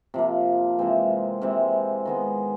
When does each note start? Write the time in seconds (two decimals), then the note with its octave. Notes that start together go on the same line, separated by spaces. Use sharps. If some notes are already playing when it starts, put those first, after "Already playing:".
0.14 C3 F3 A#3
0.79 C3 E3 G#3 C4
1.41 C3 E3 G#3 C4
2.06 D#3 G#3 B3